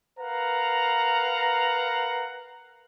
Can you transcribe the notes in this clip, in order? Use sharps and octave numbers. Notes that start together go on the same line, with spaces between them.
A#4 B4 F5 F#5 A#5